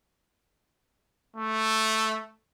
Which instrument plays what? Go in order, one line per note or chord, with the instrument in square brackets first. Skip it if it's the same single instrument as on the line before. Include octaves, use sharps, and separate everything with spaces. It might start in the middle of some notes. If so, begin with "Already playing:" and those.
[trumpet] A3